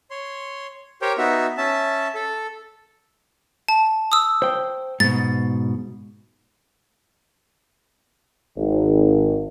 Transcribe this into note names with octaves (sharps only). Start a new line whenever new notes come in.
C#5 C6
G4 A#4 C5 C#5 G5
B3 D#4 F#4 E5
C#4 E5 A5
A4
A5
D#6 E6
C5 G5
G#2 B2 A6
G#1